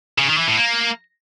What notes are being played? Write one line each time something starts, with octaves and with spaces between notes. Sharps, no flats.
C#3
D#3
E3
A2
A#3